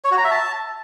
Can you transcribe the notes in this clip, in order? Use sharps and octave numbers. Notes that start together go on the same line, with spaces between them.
C#5
F#4
A#5
E5
A5